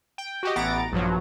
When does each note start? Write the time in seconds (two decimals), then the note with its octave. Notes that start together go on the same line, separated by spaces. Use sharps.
0.18 G5
0.43 F#4 G4 D#5
0.56 A1 E3 B3 A#5 A6 D7
0.92 A#1 G2 B2 F3 F#3